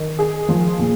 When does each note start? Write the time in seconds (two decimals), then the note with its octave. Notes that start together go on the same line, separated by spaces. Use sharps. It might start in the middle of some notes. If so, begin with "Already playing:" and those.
Already playing: D#3
0.19 G#4
0.49 F3
0.79 A#2